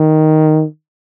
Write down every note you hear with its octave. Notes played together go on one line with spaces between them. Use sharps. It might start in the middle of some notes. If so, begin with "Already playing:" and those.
Already playing: D#3